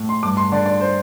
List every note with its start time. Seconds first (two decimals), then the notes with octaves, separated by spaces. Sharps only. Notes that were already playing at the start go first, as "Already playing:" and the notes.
Already playing: A2
0.09 C6
0.23 G2 D6
0.37 C6
0.52 D3 D5
0.66 D5
0.81 C5